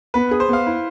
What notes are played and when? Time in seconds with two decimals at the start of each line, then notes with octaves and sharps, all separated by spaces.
0.14 B3 B4
0.31 G#4
0.40 C5
0.49 B3 F5
0.66 E4